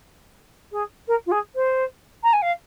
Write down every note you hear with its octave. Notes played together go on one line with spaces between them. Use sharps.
G#4
A#4
F4
G#4
C5
A#5
G#5
F5